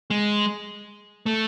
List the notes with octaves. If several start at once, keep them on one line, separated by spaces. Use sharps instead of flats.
G#3
A3